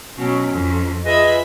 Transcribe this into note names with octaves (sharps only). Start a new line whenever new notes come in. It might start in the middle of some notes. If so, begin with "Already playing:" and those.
B2 F#3 C#4
F2
F4 G#4 B4 D#5 E5 B5